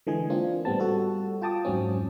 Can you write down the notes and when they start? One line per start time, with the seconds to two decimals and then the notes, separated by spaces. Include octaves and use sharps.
0.07 D3 E3 G#3 G#4 G#5
0.30 A#3 C4 D4 F4
0.65 A2 G3 B3 C4 A5
0.80 G3 F#4 A4
1.41 F4 G5 A5 D6 D#6
1.65 F2 G#2 F#3 C4 C#4